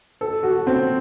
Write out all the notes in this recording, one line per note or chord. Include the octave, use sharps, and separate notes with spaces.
A4
F#4
C4